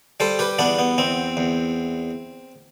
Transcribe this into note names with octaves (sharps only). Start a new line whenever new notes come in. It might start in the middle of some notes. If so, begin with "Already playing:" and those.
G3 A4 C5
G4 B4
E2 B3 D4
B3
E2 C4
E2